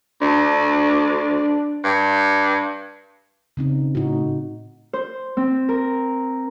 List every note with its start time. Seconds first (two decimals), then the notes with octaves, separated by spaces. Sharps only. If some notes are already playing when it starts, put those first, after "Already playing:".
0.22 D2 D4
1.84 G2
3.57 C#3 C4 D#4
3.95 A2 D#4 F#4
4.93 C5
5.37 C4
5.69 A#4